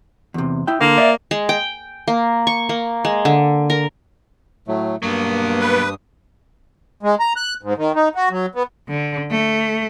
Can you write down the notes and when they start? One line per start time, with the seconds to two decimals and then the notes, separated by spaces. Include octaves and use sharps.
0.34 E2 C3
0.67 E4 G5
0.81 D3 A#3
0.98 D5 E5
1.31 G#3
1.49 G5
2.08 A#3
2.47 C#6
2.69 A#3
3.05 G#3
3.25 D3
3.70 A#4
4.68 A2 F#3 A3
5.03 G2 F#3 A#3 B3 D#6
5.60 B4
7.03 G#3
7.20 A#5
7.36 F#6
7.63 G#2
7.77 D#3
7.95 D#4
8.15 F#4
8.30 F#3
8.55 B3
8.88 D3
9.30 A3